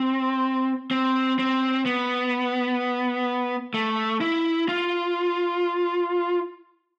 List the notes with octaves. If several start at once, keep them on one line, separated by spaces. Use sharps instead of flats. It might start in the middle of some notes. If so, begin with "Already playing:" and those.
Already playing: C4
C4
C4
B3
A3
E4
F4